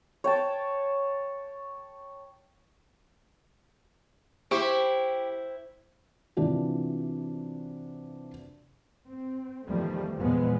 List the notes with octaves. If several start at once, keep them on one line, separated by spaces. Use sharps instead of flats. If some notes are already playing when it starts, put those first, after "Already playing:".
C#5 G5 A5
E4 G4 C5 C#6
C3 E3 D4 F4 F#4
C4
E2 D#3 F3 G3 A3
E2 A#2 F3 G#3 B3